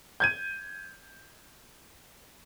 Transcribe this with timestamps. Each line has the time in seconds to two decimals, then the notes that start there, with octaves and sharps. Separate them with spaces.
0.20 G6 G#6 D#7